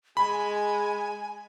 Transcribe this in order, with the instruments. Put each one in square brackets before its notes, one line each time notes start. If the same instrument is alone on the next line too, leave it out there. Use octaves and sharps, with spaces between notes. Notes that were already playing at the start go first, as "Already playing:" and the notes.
[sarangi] G#3 [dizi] G#5 [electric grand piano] B5